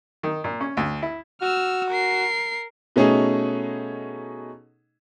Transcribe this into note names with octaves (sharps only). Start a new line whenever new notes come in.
D#3
A#2
C#4
D2
E4
F#4 E6 F6
A#4 C7
B2 A3 C#4 D#4 G#4